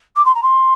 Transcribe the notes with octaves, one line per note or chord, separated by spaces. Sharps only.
D6
C6
A#5
C6